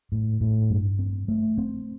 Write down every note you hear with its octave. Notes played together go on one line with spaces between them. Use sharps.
A2
A2
G2
C4
A3
C4